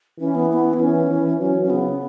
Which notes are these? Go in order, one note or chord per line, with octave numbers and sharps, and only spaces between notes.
E3 C#4
B3
B3
E4
E3 C#4
E3
F#3 C#4
C#4
C#3 B3